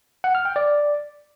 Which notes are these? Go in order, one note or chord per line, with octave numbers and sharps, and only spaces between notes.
F#5
F6
G5
D5